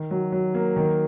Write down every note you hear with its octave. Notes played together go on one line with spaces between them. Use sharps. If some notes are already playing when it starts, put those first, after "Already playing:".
Already playing: D#3
F#3
F#3
A#3
D#3